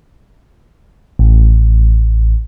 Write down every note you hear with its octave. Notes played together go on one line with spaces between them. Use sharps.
A1